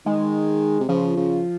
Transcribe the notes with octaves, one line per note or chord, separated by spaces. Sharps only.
D#3 G#3
C3
C#3 F3
C#3